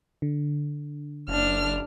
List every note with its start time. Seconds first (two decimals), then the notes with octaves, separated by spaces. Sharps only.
0.22 D3
1.28 F#1 D4 F6